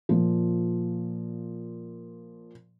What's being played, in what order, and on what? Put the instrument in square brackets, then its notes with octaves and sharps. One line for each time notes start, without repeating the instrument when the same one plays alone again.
[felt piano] A#2 F3